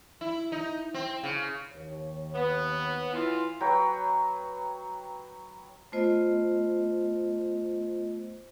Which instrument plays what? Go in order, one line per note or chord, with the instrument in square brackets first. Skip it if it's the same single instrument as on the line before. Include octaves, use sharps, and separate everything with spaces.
[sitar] E4
D#4
C4
C#3
[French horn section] D#2 C#5
[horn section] B3
E3 F4
[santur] F#3 B4 C#5 G5
[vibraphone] A3 B3 F4 C5 D#5